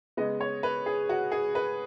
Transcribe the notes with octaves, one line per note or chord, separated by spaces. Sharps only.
C#3 G#3 B3 D#5
C#5
B4
G#4
F#4
G#4
B4